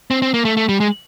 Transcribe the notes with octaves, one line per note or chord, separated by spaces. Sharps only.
C4
C4
A#3
A3
A3
G3
G#3